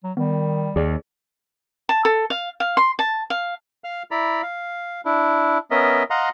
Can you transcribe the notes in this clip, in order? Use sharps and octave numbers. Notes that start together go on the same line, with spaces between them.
F#3
D#3 G3 B3
D#2 G#4 D5
A5
A4
F5
F5
C6
A5
F5
F5 F6
E4 D5 A#5 B5
F5
D4 E4
B3 C#4 A#4 D#5 E5
D#5 F5 F#5 A#5 C6